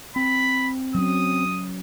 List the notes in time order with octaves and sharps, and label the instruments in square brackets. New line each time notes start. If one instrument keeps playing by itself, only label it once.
[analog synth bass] C4 [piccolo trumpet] B5
[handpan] F#3 C#4 [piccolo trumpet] D#6